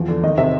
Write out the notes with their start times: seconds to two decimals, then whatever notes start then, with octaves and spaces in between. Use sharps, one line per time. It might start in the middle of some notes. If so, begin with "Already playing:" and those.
Already playing: E2 F3
0.08 D3
0.23 D#3 D#5
0.38 C3 E5